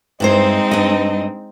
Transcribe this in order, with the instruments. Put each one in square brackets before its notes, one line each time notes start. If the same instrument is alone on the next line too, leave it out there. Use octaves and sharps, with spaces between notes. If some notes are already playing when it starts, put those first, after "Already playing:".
[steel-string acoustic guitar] G2 E4 C5 [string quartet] G#3 C4 D#4
[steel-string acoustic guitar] G2 D#5